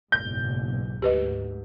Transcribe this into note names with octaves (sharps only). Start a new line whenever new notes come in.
F#1 B1 G#2 G6
D2 G#2 G4 B4 D#5